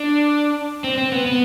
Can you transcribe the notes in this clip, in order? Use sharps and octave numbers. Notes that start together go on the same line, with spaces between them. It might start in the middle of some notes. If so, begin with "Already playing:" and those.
Already playing: D4
C4
C4
B3
B3